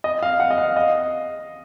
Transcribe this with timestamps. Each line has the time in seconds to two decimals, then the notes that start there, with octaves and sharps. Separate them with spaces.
0.04 D#5
0.23 F5
0.40 F#5
0.51 D#5
0.58 F5
0.76 D#5